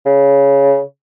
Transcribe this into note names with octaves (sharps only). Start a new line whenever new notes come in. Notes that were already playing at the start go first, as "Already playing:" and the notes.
C#3